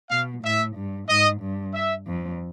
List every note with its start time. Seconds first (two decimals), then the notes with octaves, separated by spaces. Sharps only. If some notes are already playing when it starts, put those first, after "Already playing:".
0.11 B2 F5
0.43 A2 E5
0.76 G2
1.09 G#2 D#5
1.41 G2
1.74 E5
2.07 F2